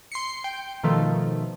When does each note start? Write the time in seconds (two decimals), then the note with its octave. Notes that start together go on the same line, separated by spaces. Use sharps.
0.12 C6 C7 C#7
0.44 G5
0.83 B2 D#3 F3 A3